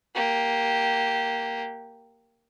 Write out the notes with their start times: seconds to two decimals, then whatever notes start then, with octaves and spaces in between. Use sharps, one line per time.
0.15 A#3 G4